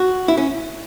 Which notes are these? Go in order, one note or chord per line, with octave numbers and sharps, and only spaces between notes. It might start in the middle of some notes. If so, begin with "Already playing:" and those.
Already playing: F#4
E4
C#4